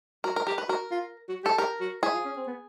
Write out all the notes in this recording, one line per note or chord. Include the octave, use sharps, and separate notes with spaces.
F#4 A#4
A#4
G4 A#4
B4
F#4 A#4
F4
F#4
G4 A4
G4 A#4
F#4
E4 G#4
F4
C#4
C4
B3